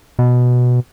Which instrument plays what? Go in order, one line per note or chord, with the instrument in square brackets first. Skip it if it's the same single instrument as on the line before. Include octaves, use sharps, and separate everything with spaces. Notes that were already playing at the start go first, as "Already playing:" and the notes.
[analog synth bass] B2